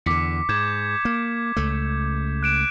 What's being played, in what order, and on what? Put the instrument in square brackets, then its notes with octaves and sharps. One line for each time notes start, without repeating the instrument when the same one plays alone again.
[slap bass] E2 D3 [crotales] D6 B6 C#7
[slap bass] G#2 [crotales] G6 G#6 E7
[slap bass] A#3
C#2 A3
[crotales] F#6 D7 E7